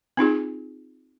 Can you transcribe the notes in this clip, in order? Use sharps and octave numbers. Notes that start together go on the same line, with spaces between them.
C4 D#4 F4 G#4